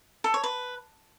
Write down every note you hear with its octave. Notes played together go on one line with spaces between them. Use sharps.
A4
C#5
B4